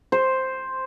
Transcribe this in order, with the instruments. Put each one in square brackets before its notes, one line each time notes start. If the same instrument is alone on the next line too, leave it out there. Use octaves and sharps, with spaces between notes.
[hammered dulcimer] C5